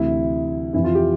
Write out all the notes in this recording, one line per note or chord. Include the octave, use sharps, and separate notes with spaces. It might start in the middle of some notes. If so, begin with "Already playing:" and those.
Already playing: D2 C3 E3 E4
F2 C3 E3 E4
F4
G4